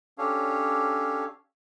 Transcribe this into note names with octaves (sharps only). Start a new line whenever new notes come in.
C#4 D4 G4 A4 C#5 F5